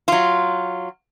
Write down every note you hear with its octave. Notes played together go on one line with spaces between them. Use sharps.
F#3 F4